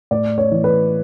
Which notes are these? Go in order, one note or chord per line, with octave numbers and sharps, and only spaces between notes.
A2 D5
C#5
E3
B4